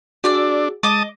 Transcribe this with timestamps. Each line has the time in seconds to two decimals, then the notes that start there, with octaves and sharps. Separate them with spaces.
0.24 D4 F#4 G#4 D5 D6 E6
0.83 G#3 D#5 A5 D6 D#6